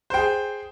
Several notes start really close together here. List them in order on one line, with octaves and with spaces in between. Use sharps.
C5 G5 G#4